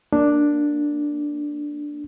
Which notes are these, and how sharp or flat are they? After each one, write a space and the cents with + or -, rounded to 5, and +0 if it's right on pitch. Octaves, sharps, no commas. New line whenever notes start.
A#3 +0 D4 +0